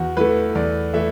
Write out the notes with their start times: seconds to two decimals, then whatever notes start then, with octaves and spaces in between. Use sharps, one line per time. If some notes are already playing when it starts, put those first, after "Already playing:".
Already playing: E2 F#4
0.17 E3 A3 B4
0.55 E2 D5
0.94 E3 A3 E5